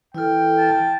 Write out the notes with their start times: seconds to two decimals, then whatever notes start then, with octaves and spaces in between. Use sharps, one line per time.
0.15 E3 E4 A4 G5 F6
0.58 A5